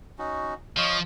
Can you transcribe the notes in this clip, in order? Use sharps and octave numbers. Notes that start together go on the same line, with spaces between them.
C#4 D#4 F#4
F3 C#5 D#5 F5